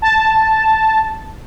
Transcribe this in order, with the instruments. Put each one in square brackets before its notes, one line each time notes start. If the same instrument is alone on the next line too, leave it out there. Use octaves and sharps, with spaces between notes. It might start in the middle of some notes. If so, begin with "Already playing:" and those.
[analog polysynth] A5